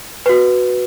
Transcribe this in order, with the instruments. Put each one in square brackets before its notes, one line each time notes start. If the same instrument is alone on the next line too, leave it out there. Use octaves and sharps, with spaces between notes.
[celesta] F#4 B4